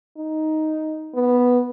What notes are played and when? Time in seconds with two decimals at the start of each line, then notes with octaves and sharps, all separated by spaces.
0.17 D#4
1.14 B3